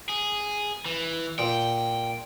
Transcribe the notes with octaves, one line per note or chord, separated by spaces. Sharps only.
G#4
E3
A#2 G5